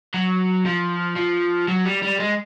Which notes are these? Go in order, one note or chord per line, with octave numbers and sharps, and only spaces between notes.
F#3
F3
F3
F#3
G3
G3
G#3